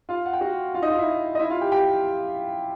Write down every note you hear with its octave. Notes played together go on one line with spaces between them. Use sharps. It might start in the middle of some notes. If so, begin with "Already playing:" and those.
F4 F5
F#5
G5
F#4 F#5
F4 F5
D#4 D#5
F4 F5
E4 E5
D#5
E4 E5
F4 F5
G4 G5
G4 G5